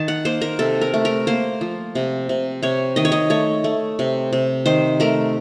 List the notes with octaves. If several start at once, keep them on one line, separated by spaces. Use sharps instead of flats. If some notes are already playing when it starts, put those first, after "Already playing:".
Already playing: D#3 A5
F#5
A#3 C5
A#4
C3 A4
A#4
A3
A#4
A#3 C5
F3
C3
C3
C3 C#5
D#3 D#5
C#5
D#5
A3 C#5
A3
C3
C3
D#3 C5
A3 A#4